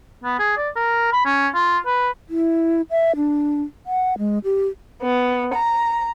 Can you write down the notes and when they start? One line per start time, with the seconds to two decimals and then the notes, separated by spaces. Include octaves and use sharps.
0.24 B3
0.39 G#4
0.57 D5
0.76 A#4
1.12 B5
1.25 C#4
1.54 F4
1.86 B4
2.30 E4
2.91 E5
3.16 D4
3.86 F#5
4.18 G#3
4.44 G4
5.01 B3
5.53 A#5